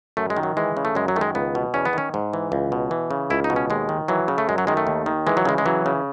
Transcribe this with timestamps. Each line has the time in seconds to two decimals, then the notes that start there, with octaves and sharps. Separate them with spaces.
0.17 F#2 A3
0.30 G#3
0.37 D#3
0.43 F#3
0.57 E3 G#3
0.77 C#3
0.85 A3
0.95 F#2 G#3
1.08 F#3
1.16 D#3 A3
1.21 G#3
1.35 C#2 B3
1.55 B2
1.74 E2 C#4
1.85 B3
1.93 D#3 C#4
2.14 G#2
2.33 E3
2.52 C#2
2.72 B2
2.91 E3
3.11 C#3
3.30 C#2 E4
3.44 D#4
3.50 B2
3.56 C#4
3.70 D#2 G#3
3.89 D#3
4.08 E3 F#3
4.28 C#3
4.38 A3
4.49 F#2 G#3
4.58 F#3
4.67 D#3 G#3
4.77 A3
4.87 D#2
5.06 D#3
5.27 E3 G#3
5.37 F#3
5.45 C#3 G#3
5.58 G#3
5.66 E3 F#3
5.86 C#3